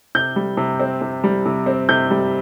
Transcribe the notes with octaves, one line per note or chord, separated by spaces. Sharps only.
C3 G6
G3
C3
C4
C3
G3
C3
C4
C3 G6
G3